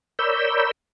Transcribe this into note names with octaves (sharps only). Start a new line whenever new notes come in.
A#4 C#5 D5 B5 E6 G6